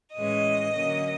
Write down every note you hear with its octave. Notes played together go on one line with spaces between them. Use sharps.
A2 E3 G#3 C#4 D#5
D3 F#3 A#3 C#4